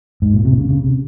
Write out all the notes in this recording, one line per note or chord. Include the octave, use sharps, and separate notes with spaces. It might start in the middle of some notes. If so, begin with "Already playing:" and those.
G#2
A#2
C3
C#3
C#3
C3